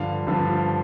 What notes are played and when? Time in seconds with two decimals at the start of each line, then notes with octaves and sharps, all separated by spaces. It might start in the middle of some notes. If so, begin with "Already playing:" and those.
Already playing: G2 D3 F3 F5
0.27 G2 D3 F3